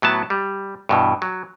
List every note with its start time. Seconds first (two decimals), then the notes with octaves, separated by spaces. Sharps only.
0.02 A2 F#3 B3 A5
0.30 G3
0.89 G2 B2 E3
1.22 F#3